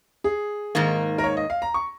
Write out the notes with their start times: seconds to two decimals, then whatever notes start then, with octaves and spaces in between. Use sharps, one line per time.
0.24 G#4
0.75 G#2 D#3 A#3
1.18 A#4
1.24 C#5
1.37 D#5
1.50 F5
1.62 A#5
1.74 C#6